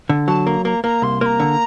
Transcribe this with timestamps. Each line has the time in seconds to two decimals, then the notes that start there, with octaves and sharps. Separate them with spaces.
0.09 D3
0.28 F#3 A5
0.47 A#3 A#5
0.65 A#3 A#5
0.84 A#3 A#5
1.02 C2 C6
1.21 A#3 A#5 C6
1.40 D3